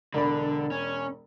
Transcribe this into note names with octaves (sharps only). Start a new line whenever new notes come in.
E1 D3 D5 B5
C#4